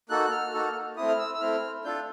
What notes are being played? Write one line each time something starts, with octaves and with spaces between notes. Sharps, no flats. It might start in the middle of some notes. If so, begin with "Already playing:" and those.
A#3 D#4 F#4 A4 F#6
F#6
F6
A#3 D#4 F#4 A4
A3 C4 E4 D#6
F6
E6
E6
A3 C4 E4 F6
D4 F4 A4 G6